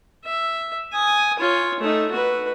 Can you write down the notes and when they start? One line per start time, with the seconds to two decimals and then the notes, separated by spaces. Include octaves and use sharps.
0.24 E5
0.93 G#5 D#6
1.39 F4 C#5
1.80 A3 D#4
2.12 F#4 B4